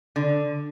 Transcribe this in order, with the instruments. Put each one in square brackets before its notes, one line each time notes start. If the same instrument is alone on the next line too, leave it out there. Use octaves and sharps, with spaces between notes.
[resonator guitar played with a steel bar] D3